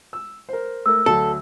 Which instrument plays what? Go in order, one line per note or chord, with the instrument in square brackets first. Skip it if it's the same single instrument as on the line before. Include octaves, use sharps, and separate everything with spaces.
[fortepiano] E6
A#4 C5
[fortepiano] A3 A#4 [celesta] E6
[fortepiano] D2 F#3 [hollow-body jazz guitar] A4